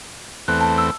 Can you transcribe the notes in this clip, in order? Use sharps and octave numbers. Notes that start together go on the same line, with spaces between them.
E2 A3 C4 F#6
A5
E6